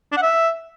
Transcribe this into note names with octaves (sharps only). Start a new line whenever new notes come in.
D4
F#5
E5